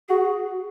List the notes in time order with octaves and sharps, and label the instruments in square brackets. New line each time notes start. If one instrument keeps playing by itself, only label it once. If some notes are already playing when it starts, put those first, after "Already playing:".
[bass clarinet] F#4 [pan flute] G#4